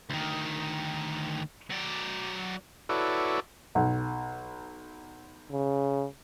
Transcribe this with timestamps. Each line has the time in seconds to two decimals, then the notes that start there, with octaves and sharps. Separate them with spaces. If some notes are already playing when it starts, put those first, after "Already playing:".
0.10 D2 D#3
1.70 F#3 D5
2.89 E4 F#4 A4 B4 C#5 D5
3.75 B1
5.51 C#3